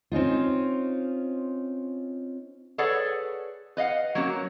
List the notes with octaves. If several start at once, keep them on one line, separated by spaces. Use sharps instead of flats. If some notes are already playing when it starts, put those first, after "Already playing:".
C4 C#4 D#4 F4
G#4 A4 B4 C#5 D5 F#5
B4 D#5 F5 F#5
F#3 A#3 C#4 F#4